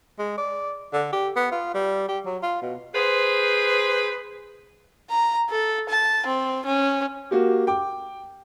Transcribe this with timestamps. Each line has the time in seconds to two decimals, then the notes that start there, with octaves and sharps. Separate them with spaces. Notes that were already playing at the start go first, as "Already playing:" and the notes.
0.19 G#3
0.38 D5
0.93 D3
1.13 G4
1.36 B3
1.52 F4
1.74 G3
2.08 G4
2.26 F#3
2.43 F4
2.62 B2
2.95 G#4 B4 C5
5.09 A#5
5.50 A4
5.89 A5
6.26 C4
6.65 C#4
7.31 A#3 F#4 G4
7.67 G5 D6